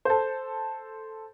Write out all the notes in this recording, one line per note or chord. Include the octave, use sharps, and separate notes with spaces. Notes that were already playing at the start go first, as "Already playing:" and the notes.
A4 C5